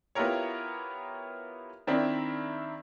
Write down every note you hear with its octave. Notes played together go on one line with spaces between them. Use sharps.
B3 E4 F4 G4 A#4 C#5
D#3 C4 D4 E4 A#4 E5